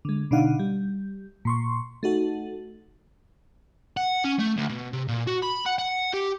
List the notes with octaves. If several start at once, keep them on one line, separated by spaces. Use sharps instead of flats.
D3 G#3
B2 D3 D4 D#4 F5 F#5
G3
A#2 C6 C#6
A3 D#4 F#4 A4
F#5
C#4
A3
D2
B2
C3
A#2
F#4
B5
F#5
F#5
G4